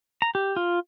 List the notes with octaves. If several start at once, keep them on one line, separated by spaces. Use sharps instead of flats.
A#5
G4
F4